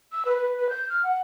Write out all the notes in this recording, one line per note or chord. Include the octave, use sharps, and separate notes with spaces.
E6
B4
B4
B4
G6
F6
F#5